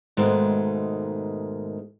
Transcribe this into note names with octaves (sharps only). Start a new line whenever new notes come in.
G#2 B2 D#3 G#3 A3